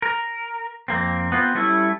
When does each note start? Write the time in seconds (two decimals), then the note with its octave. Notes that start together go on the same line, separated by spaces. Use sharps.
0.02 A#4
0.88 F2 A#3 C4
1.32 B3 C4 F4
1.55 G3 A3 C#4 E4